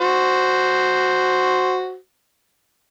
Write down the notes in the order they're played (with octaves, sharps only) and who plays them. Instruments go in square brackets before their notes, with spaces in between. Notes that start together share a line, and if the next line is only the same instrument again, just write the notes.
[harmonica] F#4 C5